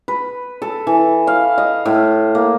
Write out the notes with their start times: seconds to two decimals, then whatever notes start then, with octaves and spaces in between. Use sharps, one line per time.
0.08 B4
0.62 A4
0.87 E3
1.27 F5
1.58 D#5
1.85 A2
2.35 A#3